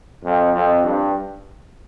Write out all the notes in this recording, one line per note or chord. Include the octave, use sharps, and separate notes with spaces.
F2
F2
G2